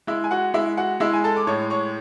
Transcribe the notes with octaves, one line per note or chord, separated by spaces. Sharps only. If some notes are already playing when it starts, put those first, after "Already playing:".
G#3 E4 E5
G#5
F#4 F#5
G#3 E4 E5
F#4 F#5
G#3 E4 E5
G#5
A4 A5
D6
A2 C#5 C#6
C#5 C#6